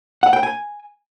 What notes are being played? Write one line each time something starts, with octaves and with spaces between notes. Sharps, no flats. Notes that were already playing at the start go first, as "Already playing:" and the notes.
F#5
G5
G#5